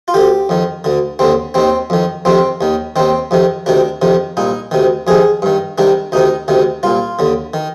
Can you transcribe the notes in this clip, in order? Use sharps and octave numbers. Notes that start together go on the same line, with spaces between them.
F4
D2 D3 G4
F2 D#3
D2 D3
D#2 D3 C4
D#2 D#3 C4
F2 D#3
F2 C3 D#3 C4
D#2 D#3
D#2 D#3 C4
F2 C3 D#3
D2 C3 D#3 D4
F2 C3 D#3
C2 A#2 D#4
D2 C3 D#3
F2 C3 D#3 G#4
G2 D#3
C2 C3 D#3 D4
D2 C3 D#3 D#4
D2 C3 D#3
C2 A#2 F4
D#2 D3
D#3